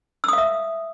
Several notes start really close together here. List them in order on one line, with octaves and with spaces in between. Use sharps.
E6 D#6 F5 E5